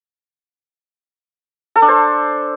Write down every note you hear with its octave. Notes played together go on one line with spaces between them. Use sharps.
A4
D4
C5